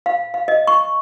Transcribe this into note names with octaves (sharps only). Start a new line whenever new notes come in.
F5
F5
D#5
C#6